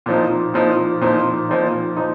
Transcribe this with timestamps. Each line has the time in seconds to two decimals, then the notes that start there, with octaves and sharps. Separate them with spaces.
0.06 A#2 F3 D#4
0.54 A#2 F3 D#4
1.01 A#2 F3 D#4
1.49 A#2 F3 D#4
1.97 F3 D#4